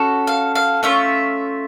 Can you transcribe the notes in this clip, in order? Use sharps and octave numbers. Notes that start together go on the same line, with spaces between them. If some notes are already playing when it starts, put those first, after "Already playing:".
Already playing: C#4 F#4 A4
F5
F5
A3 C#4 F4 E5